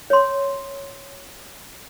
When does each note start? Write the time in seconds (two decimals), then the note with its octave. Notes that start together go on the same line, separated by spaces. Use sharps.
0.10 C#5 C6